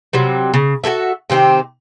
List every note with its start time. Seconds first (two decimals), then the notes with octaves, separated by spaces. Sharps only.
0.13 C3 F#3 G3
0.54 C#3
0.84 F#4 G#4 A4 E5
1.30 C3 D#3 C4 G4